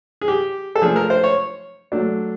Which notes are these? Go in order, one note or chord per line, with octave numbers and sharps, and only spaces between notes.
G#4
G4
A4
F3 A3 D4 G#4
A#4
C5
C#5
F#3 A3 D4